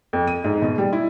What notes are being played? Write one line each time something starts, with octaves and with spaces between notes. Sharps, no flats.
F2
D#7
G#2
B2
G3
E4